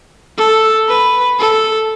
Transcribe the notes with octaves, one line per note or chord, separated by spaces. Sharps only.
A4
B4
A4